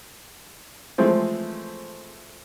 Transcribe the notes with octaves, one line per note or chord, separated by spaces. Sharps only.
E3 F3 G#3 A3 C4